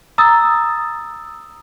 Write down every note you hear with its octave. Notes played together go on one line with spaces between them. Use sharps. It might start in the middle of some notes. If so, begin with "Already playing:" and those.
A#5 D#6 E6 A6